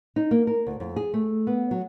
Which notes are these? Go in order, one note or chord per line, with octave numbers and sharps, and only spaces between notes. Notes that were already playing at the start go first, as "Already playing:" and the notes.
D#4
A#3
A#4
D2
F2
G#4
A3
B3
F#3